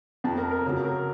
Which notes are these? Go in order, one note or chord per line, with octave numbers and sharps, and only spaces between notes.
F2 C3 F3 A5
A#4
A#4
F#2 C#3 F#3
A#4